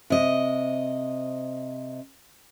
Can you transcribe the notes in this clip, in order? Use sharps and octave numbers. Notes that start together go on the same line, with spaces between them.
C3 D#5